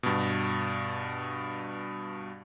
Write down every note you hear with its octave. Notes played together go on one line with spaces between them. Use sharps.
G2 B2